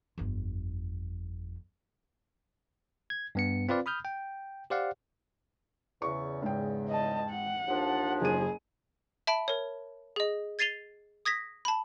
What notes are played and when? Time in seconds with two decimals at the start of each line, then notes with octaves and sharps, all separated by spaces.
0.18 G1 F2
3.10 G#6
3.35 G2 B3 C#7
3.69 C4 F4 B4 D5 F5
3.86 B5 D#6 F6 G6
4.05 G5
4.70 G4 C5 D5 F5 F#5
6.02 E2 C#3 C#6
6.43 G#2 G5
6.89 D#5 A5
7.30 F#5
7.68 D#2 F3 D4
8.21 F#1 G#4 D#7
9.27 E5 A5 B5 D7
9.48 A#4 C#5
10.16 G#4 D#5
10.59 G#6 A6 C7 D#7 F7 G7
11.25 D#6 G#6 A#6 B6
11.65 A5 B5